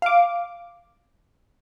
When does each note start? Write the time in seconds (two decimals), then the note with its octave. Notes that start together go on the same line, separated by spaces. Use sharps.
0.02 F5 D6